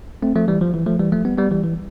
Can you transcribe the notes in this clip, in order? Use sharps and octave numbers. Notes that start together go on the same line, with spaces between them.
A3 C4
F3 A3
E3 G3
F3
E3
F3 A3
E3 G3
F3 A3
G3 B3
G3 B3
E3 G3
E3